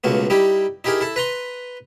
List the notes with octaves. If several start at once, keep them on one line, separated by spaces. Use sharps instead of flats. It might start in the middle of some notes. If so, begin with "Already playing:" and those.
C#2 B2 A3 A#3
G3 D#4 E4 G4
D#4 E4 G4 G#4 A#4
E4 A4
B4 A#5 C6